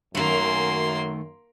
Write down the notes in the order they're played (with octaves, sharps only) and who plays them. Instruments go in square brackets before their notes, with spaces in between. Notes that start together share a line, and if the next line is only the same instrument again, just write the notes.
[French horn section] F#2 [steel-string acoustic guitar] D#3 A3 [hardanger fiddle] A#3 C6